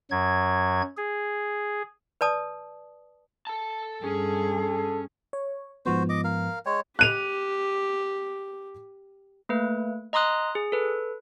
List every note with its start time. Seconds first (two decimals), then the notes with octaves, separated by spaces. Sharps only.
0.11 F#2 F#3 G#6
0.97 G#4
2.21 B4 D5 A5 D#6
3.47 A4 A5
4.04 G2 C#4 G#4 A4
5.33 C#5
5.86 G#2 F3 B3 F#4 C5
6.09 D#5 D6
6.24 A#4 F5
6.66 G#3 C#5 G5
6.99 G4 F#6 D#7 F7
9.49 A3 A#3 B4
10.13 D#5 A#5 C6 D#6 F#6
10.55 G#4
10.72 A4 B4